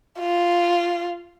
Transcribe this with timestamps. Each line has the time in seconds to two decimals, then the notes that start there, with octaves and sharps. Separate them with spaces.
0.19 F4